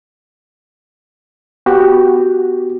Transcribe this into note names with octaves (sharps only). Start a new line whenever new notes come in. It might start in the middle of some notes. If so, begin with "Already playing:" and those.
B3 F#4 G4